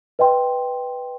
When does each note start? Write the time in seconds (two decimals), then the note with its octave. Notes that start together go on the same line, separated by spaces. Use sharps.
0.19 B4 D#5 G5 C6